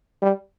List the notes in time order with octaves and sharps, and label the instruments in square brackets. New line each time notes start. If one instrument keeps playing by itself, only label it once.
[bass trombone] G3